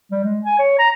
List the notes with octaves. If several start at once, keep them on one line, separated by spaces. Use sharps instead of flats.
G3
G#3
G#5
C#5
A#5